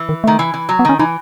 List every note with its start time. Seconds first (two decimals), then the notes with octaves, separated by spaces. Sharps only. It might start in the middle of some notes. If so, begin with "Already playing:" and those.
Already playing: E3
0.09 D#3
0.24 D#3 A3
0.39 E3
0.54 E3
0.69 F#3
0.79 B3
0.85 D#3 C#4
0.99 E3 D#4